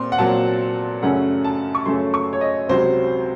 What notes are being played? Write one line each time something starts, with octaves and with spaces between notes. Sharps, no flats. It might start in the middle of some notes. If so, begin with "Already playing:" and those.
Already playing: A#2 C4 C6
F#5
A#2 F#3 C4 A5
F#2 C#3 A3 C#4 F#5
A5
C#6
F#2 C#3 A3 C#4 C6
C#6
C#5
D#5
C#2 C3 F#3 C5